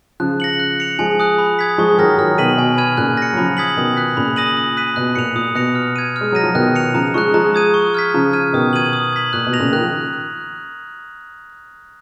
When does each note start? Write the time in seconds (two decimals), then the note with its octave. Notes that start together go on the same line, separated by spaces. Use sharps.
0.20 C#3 F3 F#6
0.40 A#6 C#7 F#7
0.59 F#6
0.80 C#7 F7
0.99 F3 G#3 G#5
1.20 D#6 F#6
1.38 B5
1.59 D#6 G#6 B6
1.78 F3 G#3 C#6
1.98 D#3 F#3 F6 A#6
2.18 D#3 F#3 F6
2.38 B2 D#3 B6 D#7 F#7
2.57 B2 G#5
2.78 B5 F6 G#6 D#7
2.97 A#2 C#3 F#6
3.17 A#6 C#7
3.33 F#3
3.37 C#3 F3 B5
3.57 D#6 G#6 B6 F#7
3.77 B2 D#3 D#6
3.97 F#6 B6
4.16 A#2 C#3 B5
4.36 D#6 A#6 D#7 F#7
4.57 D#6
4.77 F#6 B6 D#7
4.96 B2 F#6
5.16 A#2 C#7 F7
5.35 A#2 D#6
5.55 B2 F#6 A#6 C#7 F7
5.75 F6
5.96 G#6 D#7
6.16 G#3 F6
6.32 F#3 A#6 D#7
6.43 F3
6.55 B2 D#3 F#6
6.76 C#7 F7
6.94 C#3 F3 A#5
7.14 F3 G#3 C#6 F#6
7.34 F3 G#3 A#5
7.55 D#6 G#6 D#7
7.74 C#6
7.94 F6 G#6 B6
8.14 C#3 F3 A#5
8.33 F6 G#6 D#7
8.53 B2 D#3 D#6
8.73 G#6 D#7 F#7
8.93 D#6
9.13 G#6 B6 F#7
9.33 A#2 F#6
9.46 B2
9.53 A#6 F7
9.59 A#2 C#3
9.72 D#3 F#6
9.81 F3